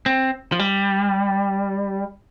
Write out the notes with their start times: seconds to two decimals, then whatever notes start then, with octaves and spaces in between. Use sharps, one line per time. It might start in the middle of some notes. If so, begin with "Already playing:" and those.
0.06 C4
0.52 F3
0.59 G3